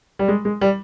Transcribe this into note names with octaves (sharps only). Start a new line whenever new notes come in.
G3
G#3
G#3
G3